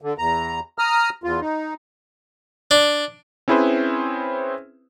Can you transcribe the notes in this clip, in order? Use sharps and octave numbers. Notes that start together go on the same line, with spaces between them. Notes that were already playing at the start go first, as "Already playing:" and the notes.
D3
E2 A#5
A#5 D#6 F6
E2 F4
D#4
D4
C4 C#4 E4 G#4 B4 C5